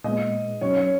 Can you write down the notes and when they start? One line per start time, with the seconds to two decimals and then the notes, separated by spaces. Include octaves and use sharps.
0.04 A#2 G#3 B3 D#5
0.61 B2 F#3 C#4 C#5
0.77 C#5